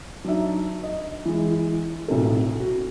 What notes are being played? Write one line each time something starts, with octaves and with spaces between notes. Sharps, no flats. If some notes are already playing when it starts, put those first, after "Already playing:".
F#3 D4 D#4 E5
D#5
E3 G#3
B1 A2 C3 A4
F#4